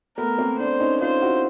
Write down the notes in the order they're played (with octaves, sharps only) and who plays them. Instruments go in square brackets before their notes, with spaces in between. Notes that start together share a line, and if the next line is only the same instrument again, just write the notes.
[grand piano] A3 B3 [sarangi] A#4
[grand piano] A#3 C4
[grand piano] C4 D4 [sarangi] C5
[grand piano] C#4 D#4
[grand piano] D#4 F4 [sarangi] C5
[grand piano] E4 F#4